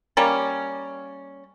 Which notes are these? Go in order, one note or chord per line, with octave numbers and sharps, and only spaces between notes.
G3 A#3 C#4